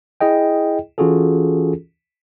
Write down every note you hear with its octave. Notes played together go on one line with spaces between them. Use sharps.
E4 G#4 D#5 G5
E3 C#4 F4 F#4 G#4 A4